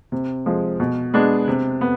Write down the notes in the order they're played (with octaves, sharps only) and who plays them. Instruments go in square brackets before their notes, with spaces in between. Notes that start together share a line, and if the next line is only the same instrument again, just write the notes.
[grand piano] C3
F3 G#3
B2
G#3 B3 D4
C3
B3